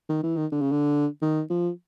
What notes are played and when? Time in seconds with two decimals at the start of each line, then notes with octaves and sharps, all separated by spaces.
0.10 D#3
0.23 E3
0.37 D#3
0.52 D3
0.61 C#3
0.72 D3
1.22 D#3
1.50 F3